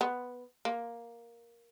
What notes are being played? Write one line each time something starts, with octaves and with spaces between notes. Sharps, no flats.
B3
A#3